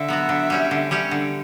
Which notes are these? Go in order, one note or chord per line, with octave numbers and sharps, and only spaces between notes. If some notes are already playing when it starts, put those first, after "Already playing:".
Already playing: D3 E5
F#3 B3 F#4
D3
G3 C#4 G4
D3
G3 C#4 G4
D3